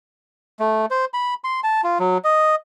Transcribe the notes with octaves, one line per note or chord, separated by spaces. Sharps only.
A3
C5
B5
C6
A5
F4
F#3
D#5